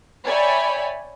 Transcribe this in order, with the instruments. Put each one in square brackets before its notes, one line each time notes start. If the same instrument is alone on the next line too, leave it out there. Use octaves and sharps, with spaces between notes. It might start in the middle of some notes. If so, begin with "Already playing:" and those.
[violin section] C#5 D5 E5 G5 G#5 B5